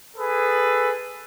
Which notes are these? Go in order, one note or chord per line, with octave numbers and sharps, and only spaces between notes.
G#4 A4 B4